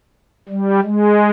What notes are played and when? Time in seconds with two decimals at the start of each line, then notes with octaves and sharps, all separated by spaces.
0.49 G3
0.83 G#3